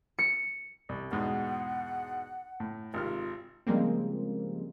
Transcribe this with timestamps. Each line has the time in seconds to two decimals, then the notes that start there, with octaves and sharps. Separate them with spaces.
0.19 C#7
0.89 C2
1.11 E2 G#2 B2 F#5
2.60 A2
2.94 G#1 C3 F4 F6
3.67 C#3 F3 G3 G#3 A#3 C4